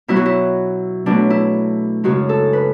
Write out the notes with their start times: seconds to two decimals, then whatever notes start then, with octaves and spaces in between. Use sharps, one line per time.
0.08 B2 F#3 B3 E4
0.16 F#4
0.25 E4
1.06 B2 F#3 A3 D4
1.30 E4
2.04 F#2 C#3 G#3 F#4
2.29 A4
2.53 B4